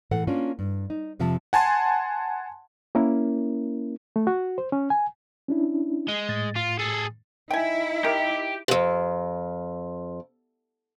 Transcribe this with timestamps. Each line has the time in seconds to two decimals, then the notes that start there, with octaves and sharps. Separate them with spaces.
0.11 A2 E3 A4 F#5
0.27 A#3 C#4 D4 F4
0.59 G2
0.90 D#4
1.19 F2 C3 F3 E5 A5
1.53 F#5 G#5 A5 C6
2.95 A#3 C#4 E4 A#4
4.16 A3
4.27 F#4
4.58 C5
4.72 C#4
4.90 G#5
5.48 C#4 D4 E4
6.08 G#3
6.29 A2 A6
6.56 F4
6.79 G#4 A4
7.51 D#4 E4 G5 G#5
8.04 G4 A#4
8.68 F2 G#2